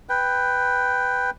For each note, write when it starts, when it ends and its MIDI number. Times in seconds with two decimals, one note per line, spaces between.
0.09 1.30 71
0.09 1.30 79